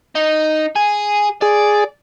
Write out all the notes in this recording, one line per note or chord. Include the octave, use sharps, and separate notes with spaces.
D#4
G#4
G#4 D5